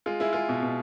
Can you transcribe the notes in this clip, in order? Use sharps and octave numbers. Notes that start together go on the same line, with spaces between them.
G#3 F4
G#3 E4
G#3 F4
B2
B2